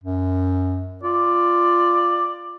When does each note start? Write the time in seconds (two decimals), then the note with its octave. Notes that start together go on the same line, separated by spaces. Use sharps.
0.04 F#2
1.03 F4 D5